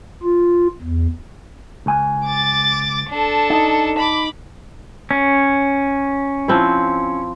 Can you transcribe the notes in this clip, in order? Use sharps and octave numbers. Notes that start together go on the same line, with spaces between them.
F4
E2
C#2 G#5
D6 A6
D4 A4
D#4
B5 D6
C#4
F3 C4 E4